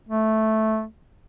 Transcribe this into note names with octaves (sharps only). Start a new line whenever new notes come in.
A3